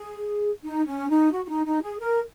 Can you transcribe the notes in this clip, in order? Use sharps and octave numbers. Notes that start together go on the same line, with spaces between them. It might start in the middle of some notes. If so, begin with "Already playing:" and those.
Already playing: G#4
D#4
C#4
D#4
F#4
F#4
D#4
D#4
G#4
A#4